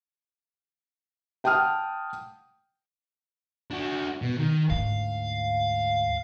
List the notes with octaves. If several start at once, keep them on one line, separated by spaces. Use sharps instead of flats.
F#5 G5 A5 D#6 F6
D4 F#4
B2
D#3
D2 G#2 F5